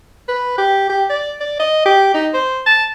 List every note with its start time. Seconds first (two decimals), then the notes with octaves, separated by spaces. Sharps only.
0.28 B4
0.58 G4
0.89 G4
1.10 D5
1.40 D5
1.59 D#5
1.86 G4
2.14 D#4
2.34 C5
2.66 A5